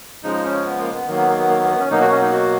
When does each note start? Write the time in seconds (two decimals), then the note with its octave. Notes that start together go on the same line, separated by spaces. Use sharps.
0.23 C#3 F3 G#3 D#4
0.44 C#4
0.65 B3
0.79 A#3
0.93 B3
1.07 D#3 F#3 A#3
1.17 B3
1.28 A#3
1.38 B3
1.49 A#3
1.59 B3
1.64 A#3
1.70 B3
1.79 C#4
1.90 B2 F#3 A#3 D#4
2.01 F#4
2.11 C#4
2.21 D#4
2.32 F#4